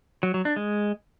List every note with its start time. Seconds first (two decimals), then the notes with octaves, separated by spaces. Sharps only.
0.23 F#3
0.34 F#3
0.45 D4
0.56 G#3